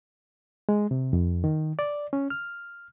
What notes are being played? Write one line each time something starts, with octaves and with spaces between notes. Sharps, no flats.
G#3
C3
F2
D#3
D5
C#4
F6